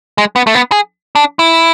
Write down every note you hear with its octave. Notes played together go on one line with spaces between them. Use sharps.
G#3
B3
A3
B3
G#4
D4
E4